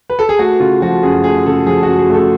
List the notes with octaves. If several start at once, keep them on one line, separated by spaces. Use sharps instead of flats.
B4
A4
G#4
A3 F#4
C#3 F4
F3 F#4
F#2 G#4
A3 G#4
C#3 A4
F3 G#4
F#2 F#4
G#4
A3 A4